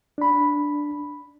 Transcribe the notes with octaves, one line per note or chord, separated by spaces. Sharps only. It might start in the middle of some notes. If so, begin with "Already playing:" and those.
D4 B5